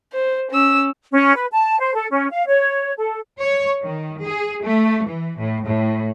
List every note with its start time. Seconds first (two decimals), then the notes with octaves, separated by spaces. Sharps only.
0.13 C5
0.51 C#4 E6
1.12 C#4
1.36 B4
1.52 A5
1.80 C5
1.94 A4
2.12 C#4
2.31 F5
2.47 C#5
2.97 A4
3.42 C#5
3.84 D#3
4.24 G#4
4.63 A3
5.07 E3
5.38 A2
5.66 A2